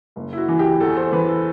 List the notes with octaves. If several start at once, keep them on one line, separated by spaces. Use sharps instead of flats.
F#1
E4
F#4
E3
G4
E2 A4
C5
E3 B4
A4